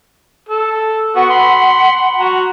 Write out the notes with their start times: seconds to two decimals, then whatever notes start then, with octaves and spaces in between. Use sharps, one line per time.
0.49 A4
1.16 B3 F#4 F#5
1.30 B5 C6
2.19 F#4 A#5